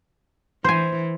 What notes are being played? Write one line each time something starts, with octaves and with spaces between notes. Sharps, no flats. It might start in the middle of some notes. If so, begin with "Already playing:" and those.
E3 C5 G#5